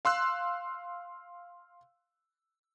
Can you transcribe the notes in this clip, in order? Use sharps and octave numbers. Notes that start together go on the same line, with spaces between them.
F5 C6 E6 F#6